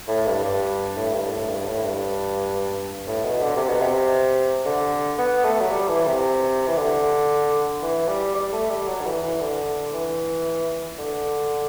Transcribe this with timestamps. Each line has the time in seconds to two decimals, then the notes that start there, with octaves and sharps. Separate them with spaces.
0.08 A2
0.26 G2
0.43 G2
0.96 A2
1.14 G2
1.31 A2
1.49 G2
1.67 A2
1.84 G2
3.07 A2
3.25 B2
3.42 D3
3.56 C3
3.69 B2
3.81 C3
4.65 D3
5.18 B3
5.45 A3
5.61 F#3
5.71 G3
5.89 E3
6.06 C3
6.68 E3
6.77 D3
7.82 E3
8.08 G3
8.35 G3
8.52 A3
8.70 G3
8.88 F#3
9.01 D3
9.05 E3
9.23 E3
9.40 D3
9.93 E3
10.98 D3